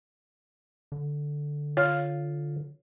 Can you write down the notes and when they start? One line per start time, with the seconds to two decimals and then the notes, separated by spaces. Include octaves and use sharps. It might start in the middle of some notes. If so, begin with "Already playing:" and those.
0.92 D3
1.77 F4 C#5